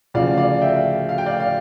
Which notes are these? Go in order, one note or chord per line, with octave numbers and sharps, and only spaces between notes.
D2 C#3 F3 D5 F5
D5 F5
E5 G5
F5
G5
D5 F5
D5 F5